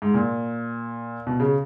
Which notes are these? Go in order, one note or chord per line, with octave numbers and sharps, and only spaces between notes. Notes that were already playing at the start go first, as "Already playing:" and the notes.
G#2
A#2
B2
C#3